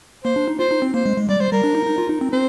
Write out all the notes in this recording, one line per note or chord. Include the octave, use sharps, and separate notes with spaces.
A#3 C5
D4
D#4
F4 C5
D#4
C4
A#3 C5
G#3
G#3
G3 D5
G3 C5
G3 A#4
D4
D#4
D#4
F4
D#4
C4
C4 C5